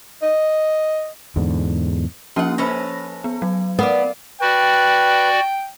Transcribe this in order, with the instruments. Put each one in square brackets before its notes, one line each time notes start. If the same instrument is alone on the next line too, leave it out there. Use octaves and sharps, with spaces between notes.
[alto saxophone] D#5
[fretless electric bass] E2 G#2 D3
[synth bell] F3 A#3 C#4 [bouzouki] F4 F#5
[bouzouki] C#4 A4 B4 [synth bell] C5 B5 A#6
[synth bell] B3
F#3
[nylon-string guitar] B3 [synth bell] A#4 [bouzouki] D5 F5
[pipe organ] F#4 D5 [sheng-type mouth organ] B4 [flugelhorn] G5